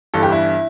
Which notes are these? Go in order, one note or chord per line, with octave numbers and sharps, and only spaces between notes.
G1 G2 E3 A4
G4
E4